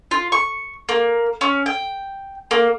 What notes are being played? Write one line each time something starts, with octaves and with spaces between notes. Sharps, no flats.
F4
C#6
A#3
C#4
G5
A#3